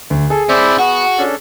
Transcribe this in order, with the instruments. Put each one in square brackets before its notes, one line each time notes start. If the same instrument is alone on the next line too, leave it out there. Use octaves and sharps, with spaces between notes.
[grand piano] D2
[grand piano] G#4 [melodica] A4
[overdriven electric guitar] C3 E4 [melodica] C5 D5 E5
[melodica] B3 [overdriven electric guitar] F#4
[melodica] C#4 D4 A4